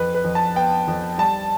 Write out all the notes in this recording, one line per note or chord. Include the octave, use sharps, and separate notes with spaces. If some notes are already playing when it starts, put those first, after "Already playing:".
Already playing: F2 B4
B4
F2
A5
B3 G5
F2
G3 A5